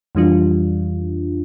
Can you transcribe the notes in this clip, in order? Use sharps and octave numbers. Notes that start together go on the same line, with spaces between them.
F2 E3 G3 D4 F4